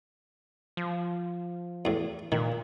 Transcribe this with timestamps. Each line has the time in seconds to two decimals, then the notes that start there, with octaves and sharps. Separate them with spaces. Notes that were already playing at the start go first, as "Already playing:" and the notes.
0.77 F3
1.85 E2 A2
2.32 A#2 D#3